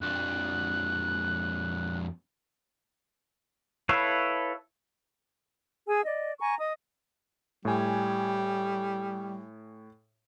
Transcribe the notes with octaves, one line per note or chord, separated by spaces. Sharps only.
F2 D4 F#6
E4 A4 B4 C#5 F5
G#4 G#5 E6
D5 D#5
G#5 A#5 C#6
D#5 D#6
A2 G3 G#5